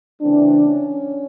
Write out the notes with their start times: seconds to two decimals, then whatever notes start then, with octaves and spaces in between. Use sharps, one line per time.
0.21 C#3 E3 A3 C4 D4
0.68 C#4